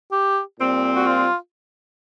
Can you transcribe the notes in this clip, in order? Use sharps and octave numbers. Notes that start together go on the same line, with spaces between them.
G4
A#2 G3 C4
F#4
F4